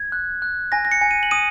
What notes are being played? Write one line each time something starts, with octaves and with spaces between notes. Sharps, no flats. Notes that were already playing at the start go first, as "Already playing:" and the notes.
Already playing: G#6
F#6
F#6
G#5 A#6
A#6
C#7
G#5
D#7
F#7
D#6 D#7